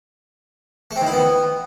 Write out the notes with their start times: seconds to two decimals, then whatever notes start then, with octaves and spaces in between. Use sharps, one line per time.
0.91 A3
0.96 C4
1.01 D#3
1.07 E4
1.12 B3